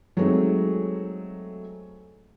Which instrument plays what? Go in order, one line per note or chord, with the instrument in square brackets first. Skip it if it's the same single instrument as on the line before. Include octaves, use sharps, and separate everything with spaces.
[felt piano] F#3 G#3 A3 C4 D#4